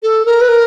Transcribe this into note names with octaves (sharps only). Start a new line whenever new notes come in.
A4
A#4
B4
A#4